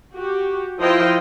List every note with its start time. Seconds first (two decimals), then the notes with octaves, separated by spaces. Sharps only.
0.16 F#4 G4
0.80 F3 E4 F4 C5 D#5 G5